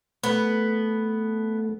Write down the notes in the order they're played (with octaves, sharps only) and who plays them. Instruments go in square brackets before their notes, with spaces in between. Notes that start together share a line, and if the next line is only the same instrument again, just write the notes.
[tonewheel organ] A3 [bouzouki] B3